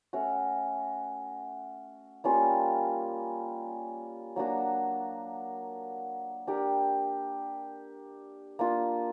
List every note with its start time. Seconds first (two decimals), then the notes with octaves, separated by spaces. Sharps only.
0.13 A3 C#4 F#4
2.24 G3 A#3 C#4 F4
4.36 F#3 A#3 D4 F#4
6.47 D4 G4 A#4
8.59 A#3 D4 F4